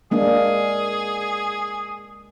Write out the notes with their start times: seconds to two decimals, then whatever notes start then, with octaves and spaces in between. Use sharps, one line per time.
0.11 G#3 A#3 D4 G#4